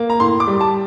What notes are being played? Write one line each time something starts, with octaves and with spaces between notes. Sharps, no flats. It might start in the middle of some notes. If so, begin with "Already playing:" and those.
Already playing: A#3
A#5
A2 C6
D6
G3
A5